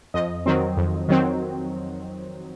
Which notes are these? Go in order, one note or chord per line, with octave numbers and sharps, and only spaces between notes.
F2 D#5
D#3 F#3 C4
F2
D#3 F#3 C4